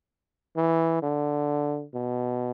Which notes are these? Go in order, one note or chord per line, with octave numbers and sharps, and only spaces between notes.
E3
D3
B2